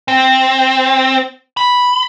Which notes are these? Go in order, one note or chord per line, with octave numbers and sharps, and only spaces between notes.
C4
B5